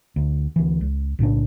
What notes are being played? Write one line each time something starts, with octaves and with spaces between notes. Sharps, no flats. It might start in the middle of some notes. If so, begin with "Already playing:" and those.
D2
D2 E3
C#2
B1 A2 C#3 D4